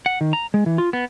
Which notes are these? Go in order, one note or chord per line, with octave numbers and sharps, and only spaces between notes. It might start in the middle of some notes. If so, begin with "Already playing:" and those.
F#5
D#3
A#5
G#3
E3
F4
B3